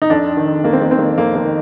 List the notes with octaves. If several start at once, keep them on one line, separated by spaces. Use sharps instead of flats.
D#4
F2 D4
D#3
F2 A#3
C4
A#3
D#3 C4
A#3
F2 A#3
A#3
D#3